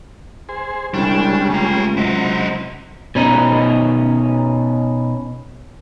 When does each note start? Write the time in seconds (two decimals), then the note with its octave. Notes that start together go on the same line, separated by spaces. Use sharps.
0.49 G#4 C5
0.94 C2 C#3 G3 G#3 D4
1.50 C#2 A3 A#5
1.97 C3 F#3 E4 D#5
3.15 B2 C#4 D#4